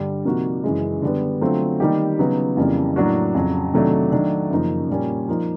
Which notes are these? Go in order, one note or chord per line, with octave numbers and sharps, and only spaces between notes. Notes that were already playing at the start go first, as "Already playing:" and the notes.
Already playing: G2 D3 G3
C3 F3 A#3 D#4 F#4
F#2 C#3 E3 G#3
D3 G3 B3
D3 F#3 A3 C4 F4
D#3 G3 A#3 D#4 G4
C#3 F#3 B3 D#4
F2 C#3 E3 G3 A#3
A2 F#3 A#3 D4 F#4
F2 C#3 F#3
C3 D#3 F#3 A3 D4
D#3 F#3 A3 D4
F#2 C#3 F3 A#3 D#4
A#2 G3 A#3 C#4
F3 A#3 D#4